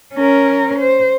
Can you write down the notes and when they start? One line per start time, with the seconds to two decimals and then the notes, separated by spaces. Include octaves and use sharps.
0.14 C#4 A#4
0.79 C5